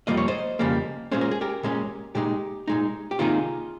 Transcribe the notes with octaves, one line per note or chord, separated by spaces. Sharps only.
F2 C#3 G3 A#3 D#5
C#5
C5 D#5
F2 C#3 G3 A#3
A#2 G#3 C#4 C5
A#4
G#4
G4 A#4
A#2 G#3 C#4
A#2 G#3 D#4 G4
A#2 G#3 D#4
G4
C3 D#3 A#3 D#4 F4 G#4